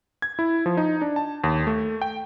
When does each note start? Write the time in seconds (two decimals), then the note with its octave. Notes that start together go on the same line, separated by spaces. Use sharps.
0.22 G#6
0.39 E4
0.66 F3
0.77 D#4
1.01 D4
1.16 A5
1.44 D#2
1.67 A3
2.02 G5